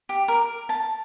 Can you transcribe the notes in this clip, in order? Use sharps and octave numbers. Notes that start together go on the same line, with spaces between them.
G4
A#4
A5